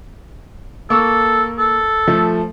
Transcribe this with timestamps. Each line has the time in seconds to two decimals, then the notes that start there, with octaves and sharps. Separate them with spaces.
0.90 A#3 A4 C#6 E6
1.58 A4
2.07 F3 A3